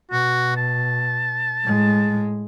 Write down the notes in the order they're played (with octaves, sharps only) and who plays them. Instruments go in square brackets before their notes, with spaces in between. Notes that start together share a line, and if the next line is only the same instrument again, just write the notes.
[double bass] B2 [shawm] F#4
[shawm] A5
[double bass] A2 G#3